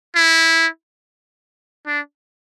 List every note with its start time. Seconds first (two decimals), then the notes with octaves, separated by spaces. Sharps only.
0.15 E4
1.86 D4